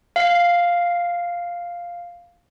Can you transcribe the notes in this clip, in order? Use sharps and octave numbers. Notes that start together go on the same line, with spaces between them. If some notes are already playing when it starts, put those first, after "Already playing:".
F5 C7